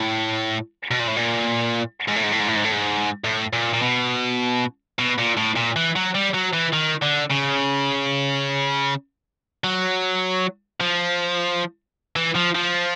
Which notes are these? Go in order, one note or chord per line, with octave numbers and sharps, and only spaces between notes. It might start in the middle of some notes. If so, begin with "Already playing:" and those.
Already playing: A2
B2
A#2
A2
A#2
G#2
A2
G#2
A2
G#2
A2
G#2
A2
G#2
A2
A#2
A#2
B2
B2
A#2
A2
A#2
E3
F#3
G3
F#3
E3
D#3
D3
C#3
F#3
F3
E3
F3
F3